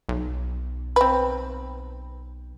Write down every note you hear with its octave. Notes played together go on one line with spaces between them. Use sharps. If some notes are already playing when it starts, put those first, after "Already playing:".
B1
C4 B4